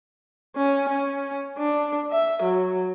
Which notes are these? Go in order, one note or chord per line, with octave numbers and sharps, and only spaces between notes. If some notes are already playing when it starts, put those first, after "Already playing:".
C#4
C#4
D4
E5
F#3